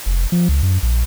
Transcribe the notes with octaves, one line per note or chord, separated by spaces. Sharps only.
F1
F3
C#2
F#2
A#1